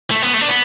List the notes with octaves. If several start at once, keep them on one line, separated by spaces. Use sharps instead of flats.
A3
B3
A3
D4
B3